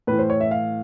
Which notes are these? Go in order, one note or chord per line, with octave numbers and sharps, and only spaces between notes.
A2 E3 B4
C5
C#5
E5
F5